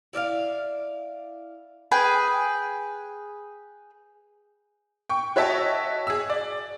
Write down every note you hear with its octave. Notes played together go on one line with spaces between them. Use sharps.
E4 D5 E5 F5
G#4 B4 G5 G#5
G5 C#6
F#4 C#5 D#5 E5 G5 A5
G#4 E6
D5